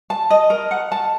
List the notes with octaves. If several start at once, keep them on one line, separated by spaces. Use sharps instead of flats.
A5
D#5
A#4
F#5
A5